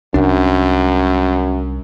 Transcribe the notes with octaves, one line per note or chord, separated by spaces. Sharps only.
C2 F#2 D4